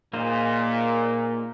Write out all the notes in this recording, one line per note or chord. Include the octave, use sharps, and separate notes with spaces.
A#2 A#3 D#4 G#4 C5